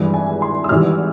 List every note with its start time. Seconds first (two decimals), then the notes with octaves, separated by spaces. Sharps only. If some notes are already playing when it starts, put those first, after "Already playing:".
Already playing: G#1 G2 E3 G#3
0.14 G#5
0.42 C6
0.64 E6
0.69 G#1 G#2 E3 G3 F6